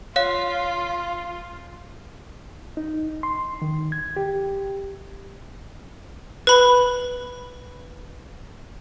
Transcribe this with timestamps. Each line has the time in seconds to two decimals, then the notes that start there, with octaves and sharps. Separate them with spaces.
0.16 F4 C#5 F5
2.77 D#4
3.23 C6
3.62 D#3
3.92 G#6
4.17 G4
6.47 B4 B5